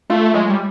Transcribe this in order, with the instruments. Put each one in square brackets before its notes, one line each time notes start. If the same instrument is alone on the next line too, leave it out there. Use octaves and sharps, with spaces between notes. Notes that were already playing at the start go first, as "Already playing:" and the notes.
[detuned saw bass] A3 [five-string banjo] F4
[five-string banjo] F#3 [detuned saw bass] G#3
[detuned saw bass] G3